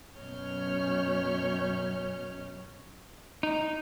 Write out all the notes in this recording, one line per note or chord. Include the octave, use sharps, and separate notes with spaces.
F#2 B2 C#4 C#5 F6 G6
D#4